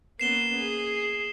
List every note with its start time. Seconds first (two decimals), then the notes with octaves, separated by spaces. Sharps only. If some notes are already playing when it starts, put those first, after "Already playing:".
0.20 A#3 B3 C#4 C7 E7 G7
0.56 G#4